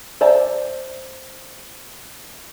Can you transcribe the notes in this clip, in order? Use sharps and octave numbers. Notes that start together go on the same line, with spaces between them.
C5 D5 E5 A5 A#5